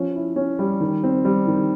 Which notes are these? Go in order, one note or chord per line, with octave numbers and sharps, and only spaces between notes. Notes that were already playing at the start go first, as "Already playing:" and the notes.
Already playing: F3 C#4
E4
C#4
G3
D#3
C4
G3
D#3